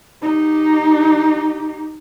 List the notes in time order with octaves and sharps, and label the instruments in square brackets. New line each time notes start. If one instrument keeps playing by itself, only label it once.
[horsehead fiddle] D#4 G4